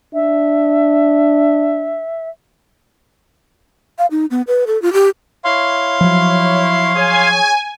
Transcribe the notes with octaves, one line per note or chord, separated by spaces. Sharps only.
D4 E5
F5
D#4
B3
B4
A4
F4
G4
E4 C#5 F5 C6
F3 F#3
G#4 C#5 G#5